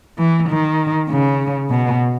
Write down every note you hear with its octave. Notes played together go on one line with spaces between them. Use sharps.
E3
D#3
C#3
B2